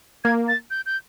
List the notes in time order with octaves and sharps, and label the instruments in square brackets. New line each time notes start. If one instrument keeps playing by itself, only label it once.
[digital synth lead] A#3 [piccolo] G#6
[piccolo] A6
G6
G6